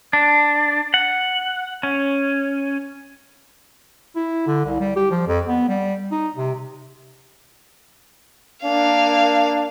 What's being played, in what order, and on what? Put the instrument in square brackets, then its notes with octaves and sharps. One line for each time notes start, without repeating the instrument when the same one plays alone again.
[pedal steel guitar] D4
F#5
C#4
[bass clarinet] E4
D3
C2
G3
G4
F3
F2
B3
G3
D#4
C3
[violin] A#3 F5 [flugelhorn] D4